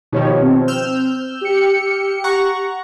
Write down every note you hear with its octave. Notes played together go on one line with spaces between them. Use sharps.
B2 D#3 F3 D#4 G4 C#5
C4
E6 F6 G6
G4 C#7
F#5 A#5 C#6